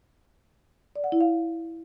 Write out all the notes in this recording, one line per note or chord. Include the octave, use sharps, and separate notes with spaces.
D5
F#5
E4
F5